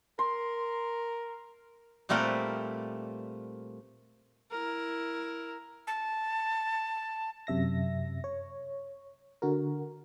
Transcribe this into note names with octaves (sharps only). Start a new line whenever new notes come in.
A#4 C6
A#2 G3 A3 C4 A#4 B4
E4 A#4
A5
F#2 C3 E5 A#6
C#5
D3 F#4 A#4